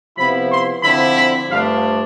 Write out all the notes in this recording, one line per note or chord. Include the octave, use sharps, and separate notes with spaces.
C3 F3 B3 E4 B5
C6
D3 F3 C4 E4 B5
B5
G2 F3 A3 D4 F5